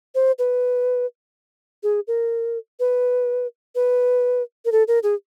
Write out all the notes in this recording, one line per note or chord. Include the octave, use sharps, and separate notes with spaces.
C5
B4
G#4
A#4
B4
B4
A#4
A4
A#4
G#4